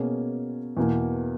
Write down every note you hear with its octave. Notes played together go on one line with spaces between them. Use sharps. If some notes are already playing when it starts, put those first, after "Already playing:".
Already playing: B2 A#3 C#4 G#4
E2 B2 A#3